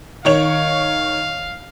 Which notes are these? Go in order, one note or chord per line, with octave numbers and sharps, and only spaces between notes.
D#3 C#5 F5 F7